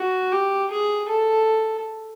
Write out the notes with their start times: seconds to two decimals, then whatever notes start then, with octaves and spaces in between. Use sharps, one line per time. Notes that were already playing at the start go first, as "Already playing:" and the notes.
Already playing: F#4
0.32 G4
0.71 G#4
1.09 A4